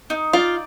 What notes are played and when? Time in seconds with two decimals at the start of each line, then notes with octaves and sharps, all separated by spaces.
0.10 D#4
0.33 F4 D5